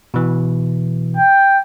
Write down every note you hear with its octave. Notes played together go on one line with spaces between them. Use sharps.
B2 E3
G5